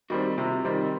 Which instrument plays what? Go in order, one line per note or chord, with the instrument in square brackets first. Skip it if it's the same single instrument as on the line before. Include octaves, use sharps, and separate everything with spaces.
[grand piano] D#3 G3 C4 [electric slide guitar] F#4 G#4
[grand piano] C3 [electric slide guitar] F4 G4
[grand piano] D#3 G3 C4